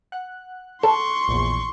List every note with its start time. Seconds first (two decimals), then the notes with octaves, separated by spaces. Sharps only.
0.12 F#5 F#6
0.83 A4 C6 C#6
1.28 A#1 E2